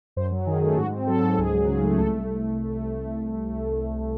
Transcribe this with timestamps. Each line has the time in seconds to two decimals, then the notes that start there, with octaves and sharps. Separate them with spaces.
0.16 F#2 C5
0.32 F#3
0.47 D#3 G#4
0.63 A3 G#4
0.77 G#2 F#4
0.93 C4
1.07 F#3 A4
1.23 G#2
1.38 C#2 G#4
1.54 F#3
1.68 C#3
1.83 A3
1.98 C2 A4